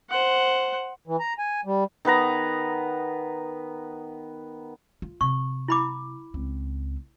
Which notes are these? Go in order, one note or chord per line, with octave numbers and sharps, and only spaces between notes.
C5 F#5
E3
A#5
G#5
G3
D#3 B3 B4 A#5
F4
C3 C#6
E4 B5 D6
C#2 C4